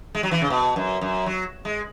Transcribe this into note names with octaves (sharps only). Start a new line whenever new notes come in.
G#3
F#3
E3
C#3
B2
F#2
F#2
F#3
G#3